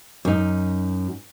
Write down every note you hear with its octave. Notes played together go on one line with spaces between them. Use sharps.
F#2 D#4